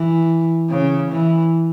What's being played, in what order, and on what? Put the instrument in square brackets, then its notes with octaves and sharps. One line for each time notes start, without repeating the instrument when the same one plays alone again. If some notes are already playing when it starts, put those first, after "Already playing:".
Already playing: [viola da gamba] E3
C#3
E3